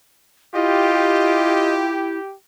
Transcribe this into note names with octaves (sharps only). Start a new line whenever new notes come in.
E4 F4 G4 D#5